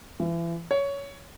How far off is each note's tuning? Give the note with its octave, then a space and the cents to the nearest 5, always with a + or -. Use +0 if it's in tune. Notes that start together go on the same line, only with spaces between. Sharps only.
E3 +35
C#5 +15